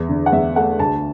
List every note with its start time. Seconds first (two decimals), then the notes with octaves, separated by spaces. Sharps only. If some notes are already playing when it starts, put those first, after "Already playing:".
Already playing: E2
0.09 D3
0.26 F#5
0.32 E2 E5
0.56 A3 F#5
0.79 D2 A5